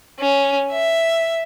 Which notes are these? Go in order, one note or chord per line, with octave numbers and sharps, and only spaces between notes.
C#4
E5